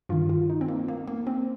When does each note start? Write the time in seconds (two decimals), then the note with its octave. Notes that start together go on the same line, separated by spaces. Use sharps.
0.09 G2 D#3 F4
0.29 F4
0.50 D#4
0.61 C4
0.68 A#3
0.88 A#3
1.08 A#3
1.27 C4